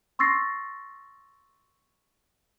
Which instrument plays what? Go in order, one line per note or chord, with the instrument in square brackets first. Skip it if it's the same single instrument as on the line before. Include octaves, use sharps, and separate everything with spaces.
[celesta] C6 C#6 E6 A6 A#6 C7